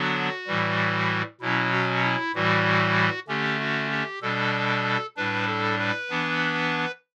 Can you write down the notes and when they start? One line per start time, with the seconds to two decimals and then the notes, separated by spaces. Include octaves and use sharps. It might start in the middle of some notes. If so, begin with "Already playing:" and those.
Already playing: D3 F#3 B3 D4 F#4
0.47 A2 E3 G3
1.41 B2 F#3 C#4 E4
1.72 F#4
2.03 E4
2.34 A2 E3 G3 F#4
3.28 D3 A3 C#4 G4
3.59 F#4
3.91 G4
4.22 B2 G3 D4 A4
5.16 A2 G3 D4 B4
5.47 A4
5.79 B4
6.10 E3 B3 D4